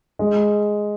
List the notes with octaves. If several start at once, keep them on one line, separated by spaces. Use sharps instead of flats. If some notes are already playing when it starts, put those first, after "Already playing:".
G#3